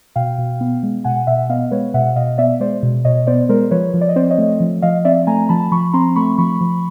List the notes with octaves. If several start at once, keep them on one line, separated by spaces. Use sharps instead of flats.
B2 F5 G5
B2
B3
G#3
B2 F#5 G#5
B2 E5 F#5
B3 D#5 F5
G#3 B4 C#5
B2 E5 F#5
B2 D#5 F5
B3 D5 E5
G#3 C5 D5
B2
B2 C#5 D#5
B3 C5 D5
G#3 A#4 C5
F3 B4 C#5
F3
D5
D#5
C4 C5 D5
C#5 D#5
A3
F3
F3 D#5 F5
C4 D5 E5
A3 G#5 A#5
F3 A5 B5
F3 B5 C#6
C4 A#5 C6
A3 B5 C#6
F3 B5 C#6
F3